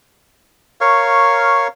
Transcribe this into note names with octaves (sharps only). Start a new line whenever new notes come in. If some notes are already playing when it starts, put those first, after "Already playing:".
A#4 C#5 F5 C#6